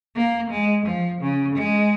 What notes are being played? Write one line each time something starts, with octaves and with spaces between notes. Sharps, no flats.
A#3
G#3
F3
C#3
G#3